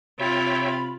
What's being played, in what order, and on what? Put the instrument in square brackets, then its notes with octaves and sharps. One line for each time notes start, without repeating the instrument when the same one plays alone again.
[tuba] C3 [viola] F4 [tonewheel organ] C#5 E5 G5 [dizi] B5